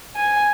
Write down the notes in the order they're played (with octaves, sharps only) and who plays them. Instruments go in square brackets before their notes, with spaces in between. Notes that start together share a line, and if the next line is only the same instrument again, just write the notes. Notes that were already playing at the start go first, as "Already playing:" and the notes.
[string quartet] G#5